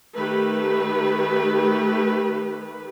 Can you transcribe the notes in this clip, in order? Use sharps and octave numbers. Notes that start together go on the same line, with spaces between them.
D#3 A3 G4 B4